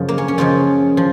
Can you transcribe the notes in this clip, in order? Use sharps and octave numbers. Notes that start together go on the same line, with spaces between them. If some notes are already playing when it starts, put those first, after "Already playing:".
Already playing: F#2 C#3 F3
A#3
C#4
C#4
F#2 C#3 F3 F4
F3